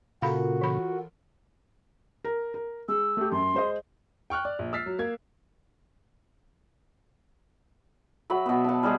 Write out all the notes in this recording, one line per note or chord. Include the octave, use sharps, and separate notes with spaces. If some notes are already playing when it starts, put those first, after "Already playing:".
A#2 C#3 F4 F#4 A4 A#4 F5 B5
E3 B5
A#4
A#4
G#3 E6
A3 G4
F#2 C6
G#3 C5 D#5
G5 C#6 F6 F#6
D5
A#1
E6 F6 A6 B6 C7
F#3
A#3 G#6
F#3 E5 B5
B2 B3
F#5 A5
G3 G#3 G#4